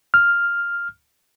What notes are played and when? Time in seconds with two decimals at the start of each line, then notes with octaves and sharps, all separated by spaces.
0.14 F6